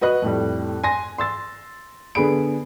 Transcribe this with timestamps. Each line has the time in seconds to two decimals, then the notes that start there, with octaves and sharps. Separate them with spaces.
0.01 F#4 B4 D#5 F#6
0.22 F2 A2 G3
0.84 G#5 C6 A#6
1.18 C6 E6 A6
2.15 D3 B3 G#4 B5 D7